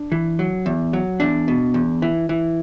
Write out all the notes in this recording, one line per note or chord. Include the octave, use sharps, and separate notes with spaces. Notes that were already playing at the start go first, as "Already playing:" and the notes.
Already playing: D4
E3
F#3
E2
F#3
E2 D4
B2
E2
E3
E3